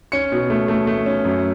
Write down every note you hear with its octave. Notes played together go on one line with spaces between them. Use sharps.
C#4 C#7
B2
A3
A3
A3
C#4
F#2